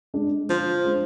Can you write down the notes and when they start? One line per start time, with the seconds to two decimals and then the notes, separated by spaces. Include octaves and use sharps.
0.14 G#3 D4
0.49 D3 F3
0.84 G#3 D4